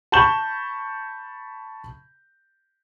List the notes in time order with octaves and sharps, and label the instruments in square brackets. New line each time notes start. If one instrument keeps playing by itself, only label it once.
[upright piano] A5 B5 C#6 G6 E7 G7